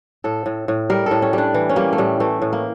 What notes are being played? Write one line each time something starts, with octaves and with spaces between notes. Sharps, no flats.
A2 A4
A2
A2
G3 A#4
A2 A4
C#4
G3 D4
E3
C#4
G3 A#3
A3
A2 G3
E3 A3
A2
A#3